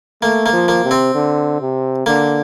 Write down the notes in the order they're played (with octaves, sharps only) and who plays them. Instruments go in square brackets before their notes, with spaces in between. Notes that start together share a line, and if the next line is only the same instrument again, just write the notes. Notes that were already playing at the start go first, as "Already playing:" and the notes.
[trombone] A3 [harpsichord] A#3
[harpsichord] A#3
[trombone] F3
[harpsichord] A#3
[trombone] C3
[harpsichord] C4
[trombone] D3
C3
[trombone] D3 [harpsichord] A#3